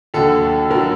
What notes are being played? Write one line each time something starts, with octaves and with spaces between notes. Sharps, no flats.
D#2 D3 F#3 A4
D#2 D3 F#3 A#4